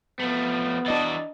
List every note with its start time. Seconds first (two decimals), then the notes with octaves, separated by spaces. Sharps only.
0.19 F3 A3 B3
0.86 E3 D4 F#4 D#5 A6